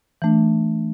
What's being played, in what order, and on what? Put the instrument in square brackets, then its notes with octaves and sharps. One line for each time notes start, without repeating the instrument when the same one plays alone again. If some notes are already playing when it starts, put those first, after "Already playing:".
[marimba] E3 A3 D4